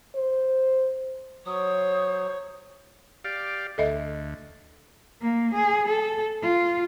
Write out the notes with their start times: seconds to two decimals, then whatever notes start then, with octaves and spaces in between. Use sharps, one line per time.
0.15 C5
1.46 F#3 C5 C#5 D#6
3.25 G4 D5 F5
3.78 D2 A4 D#5 E5
5.21 A#3
5.54 G#4
5.88 A4
6.42 F4